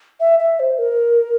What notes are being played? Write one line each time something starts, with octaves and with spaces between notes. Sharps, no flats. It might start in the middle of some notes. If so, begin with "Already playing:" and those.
E5
E5
C5
A#4